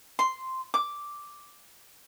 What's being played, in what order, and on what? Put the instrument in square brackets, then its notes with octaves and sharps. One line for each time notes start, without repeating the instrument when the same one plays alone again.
[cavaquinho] C6
D6